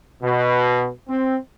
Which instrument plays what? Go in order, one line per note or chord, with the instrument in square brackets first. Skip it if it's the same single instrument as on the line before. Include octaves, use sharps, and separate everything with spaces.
[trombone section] B2
C4